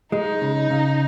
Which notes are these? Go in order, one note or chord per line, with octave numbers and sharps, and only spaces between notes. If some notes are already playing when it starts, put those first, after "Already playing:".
G#3 D#4
C#3
C#3